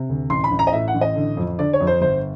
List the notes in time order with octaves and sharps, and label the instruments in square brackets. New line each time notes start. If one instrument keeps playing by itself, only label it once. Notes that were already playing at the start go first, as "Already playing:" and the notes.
Already playing: [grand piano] C3
D2
A1 C6
B5
A1
A#5
D#5
A2 E5
F#5
A1
D#5
D3
F2
D3 D5
C#5
F2
C5
G1 C5